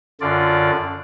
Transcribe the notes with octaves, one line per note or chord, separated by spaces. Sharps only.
F#2 D3 F4 D5